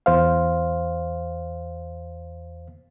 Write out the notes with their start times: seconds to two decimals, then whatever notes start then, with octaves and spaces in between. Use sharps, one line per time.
0.06 E2 C5 F5